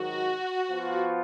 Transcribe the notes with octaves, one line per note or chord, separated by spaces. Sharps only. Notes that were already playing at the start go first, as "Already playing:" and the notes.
Already playing: G#2 D#3 F#3 F#4
F3 B3 F4